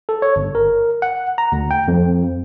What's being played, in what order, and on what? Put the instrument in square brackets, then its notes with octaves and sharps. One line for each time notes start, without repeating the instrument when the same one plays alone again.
[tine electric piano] A4
C#5
G1
A#4
F#5
A#5
D2
G5
F2